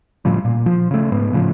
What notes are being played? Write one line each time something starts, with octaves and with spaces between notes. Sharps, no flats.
A2 C#3 F3 G3
A#2
F3
C#3 A3
G#2 B3
A2 C#3 F3